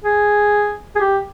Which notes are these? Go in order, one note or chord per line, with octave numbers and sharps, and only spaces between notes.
G#4
G#4
G4